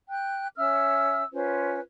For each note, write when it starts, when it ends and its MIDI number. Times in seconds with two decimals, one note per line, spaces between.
0.10 0.48 79
0.10 0.48 90
0.57 1.23 61
0.57 1.23 76
0.57 1.23 88
0.57 1.23 89
1.33 1.80 61
1.33 1.80 65
1.33 1.80 71
1.33 1.80 72